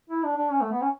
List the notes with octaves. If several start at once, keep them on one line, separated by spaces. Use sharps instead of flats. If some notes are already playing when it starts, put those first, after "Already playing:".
E4
D4
D4
C#4
A3
B3
C#4